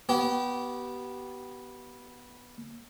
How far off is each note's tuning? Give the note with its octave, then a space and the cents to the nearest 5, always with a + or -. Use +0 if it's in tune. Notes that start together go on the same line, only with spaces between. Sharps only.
B3 -10 G4 -30